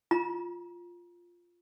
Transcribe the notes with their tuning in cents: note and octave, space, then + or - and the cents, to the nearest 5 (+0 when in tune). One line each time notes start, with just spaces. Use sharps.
F4 +0 A#5 +35